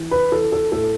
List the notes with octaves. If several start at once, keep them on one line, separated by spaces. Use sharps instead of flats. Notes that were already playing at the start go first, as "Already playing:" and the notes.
Already playing: E3
B4
E3 A4
A4
A2 A4